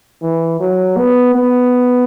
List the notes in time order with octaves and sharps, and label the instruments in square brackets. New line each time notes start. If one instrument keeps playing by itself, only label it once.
[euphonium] E3
F#3
B3
B3